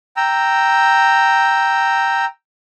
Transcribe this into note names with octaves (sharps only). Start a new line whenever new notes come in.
G5 A#5 E6